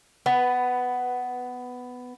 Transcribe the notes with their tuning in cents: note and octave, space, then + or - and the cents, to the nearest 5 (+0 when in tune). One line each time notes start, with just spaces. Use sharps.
B3 +10 B4 +0